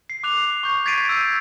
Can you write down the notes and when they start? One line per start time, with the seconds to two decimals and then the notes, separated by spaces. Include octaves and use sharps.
0.10 C7
0.23 D6 F#6 F7
0.63 C#6 G6
0.86 G#6 A6 B6 C7 D7 D#7
1.09 E6 G6 G#6